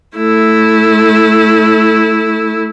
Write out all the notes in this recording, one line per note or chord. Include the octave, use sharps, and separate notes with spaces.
A3 E4